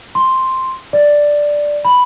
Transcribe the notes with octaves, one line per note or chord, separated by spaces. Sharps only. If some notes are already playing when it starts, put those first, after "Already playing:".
C6
D5
B5